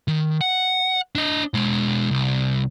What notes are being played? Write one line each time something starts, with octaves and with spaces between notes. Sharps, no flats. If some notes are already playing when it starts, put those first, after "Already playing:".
D#3
F#5
D4 D#5
B2 G#3
C2